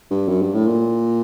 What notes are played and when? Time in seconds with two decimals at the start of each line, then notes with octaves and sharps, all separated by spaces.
0.11 G2
0.28 F#2
0.41 G2
0.54 A2
0.66 A#2